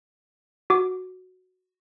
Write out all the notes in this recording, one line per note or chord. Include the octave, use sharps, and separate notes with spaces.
F#4 D6